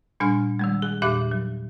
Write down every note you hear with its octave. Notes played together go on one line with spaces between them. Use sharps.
A#2 G3 D4 G#5 F6
D#3 G3 G#3
G#4
E2 A#2 G4 E5 D6 F#6
F#3